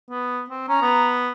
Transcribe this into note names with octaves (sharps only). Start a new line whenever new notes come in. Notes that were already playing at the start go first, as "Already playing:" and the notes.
B3
C4
C#4 A#5
B3